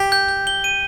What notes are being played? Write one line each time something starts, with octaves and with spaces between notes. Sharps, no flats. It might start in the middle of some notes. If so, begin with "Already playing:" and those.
Already playing: G4
G6
G6
G7
D#7